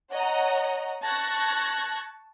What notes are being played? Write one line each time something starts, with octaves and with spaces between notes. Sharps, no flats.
C#5 D#5 F#5 A#5
A5 C#6 F#6 G#6 A#6